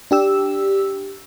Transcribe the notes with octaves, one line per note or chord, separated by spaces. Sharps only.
D4 G4 E6